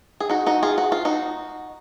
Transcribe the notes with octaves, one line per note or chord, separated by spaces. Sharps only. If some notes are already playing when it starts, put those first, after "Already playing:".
G#4
D#4 F#4
D#4 F#4
F4 G#4
F#4
F4
D#4 F#4